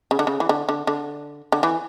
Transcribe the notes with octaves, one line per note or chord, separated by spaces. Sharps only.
C#3
D3
C#3
E3
D3
D3
D3
D3
E3